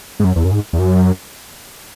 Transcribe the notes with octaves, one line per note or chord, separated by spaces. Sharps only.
G#2
F#2
E2
F#2
G#2
E2
F#2